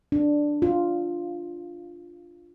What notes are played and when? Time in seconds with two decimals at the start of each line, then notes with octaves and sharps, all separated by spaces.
0.12 D4
0.62 F4